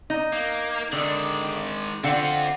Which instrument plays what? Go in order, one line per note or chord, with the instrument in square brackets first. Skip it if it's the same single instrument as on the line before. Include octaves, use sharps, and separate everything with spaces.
[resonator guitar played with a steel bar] D#4
[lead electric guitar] A#3
[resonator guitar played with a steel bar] D3 [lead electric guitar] D#3 G#3
[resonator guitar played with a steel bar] D3 F#5 [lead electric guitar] C4 F4